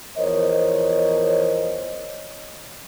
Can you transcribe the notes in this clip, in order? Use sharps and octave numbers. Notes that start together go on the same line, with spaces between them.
E2 F3 A#4 C5 C#5 D#5